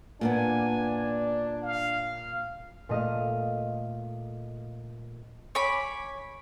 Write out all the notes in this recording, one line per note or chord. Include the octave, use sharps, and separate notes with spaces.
A#2 A#3 B3 D4 G#5
F5
A#2 A3 D#5 F5 D#6
C#5 G#5 B5 D6